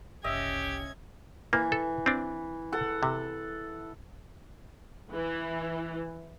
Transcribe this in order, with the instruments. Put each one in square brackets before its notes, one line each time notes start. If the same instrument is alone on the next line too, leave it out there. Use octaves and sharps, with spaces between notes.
[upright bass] F#1 C2 [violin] C#4 G#6 [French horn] G4 [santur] D#5 E5
[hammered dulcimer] E3 [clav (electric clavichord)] A#3
[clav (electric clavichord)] A4
C4 D4
[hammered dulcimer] A4 F#5
[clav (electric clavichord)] C3
[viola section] E3